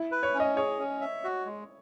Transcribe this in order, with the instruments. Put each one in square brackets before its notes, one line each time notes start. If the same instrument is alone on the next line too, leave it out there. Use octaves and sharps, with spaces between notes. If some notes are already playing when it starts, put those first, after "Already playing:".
Already playing: [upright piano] E4
[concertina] B4
[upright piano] C#5
[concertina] C#4
[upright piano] D#5
[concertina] G#4 [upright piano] C#5
[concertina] C#4
E5
F#4
G#3